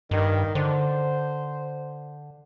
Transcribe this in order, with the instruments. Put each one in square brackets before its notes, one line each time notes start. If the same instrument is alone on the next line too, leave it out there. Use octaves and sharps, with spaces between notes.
[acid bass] G2 [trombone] D#3
[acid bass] D3 [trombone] C5